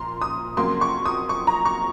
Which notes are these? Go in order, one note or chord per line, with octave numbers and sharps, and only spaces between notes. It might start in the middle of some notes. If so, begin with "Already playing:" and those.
Already playing: A#2 F3 A#5 C6
D#6
F2 C#3 F#3 A#3 C6
C#6
D#6
C#6
A#5
C#6